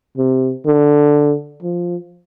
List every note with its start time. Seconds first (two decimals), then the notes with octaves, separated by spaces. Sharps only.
0.18 C3
0.66 D3
1.63 F3